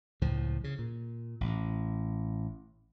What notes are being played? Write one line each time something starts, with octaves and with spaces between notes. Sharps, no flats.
C#2 A2 F3
C#3
A#2
A1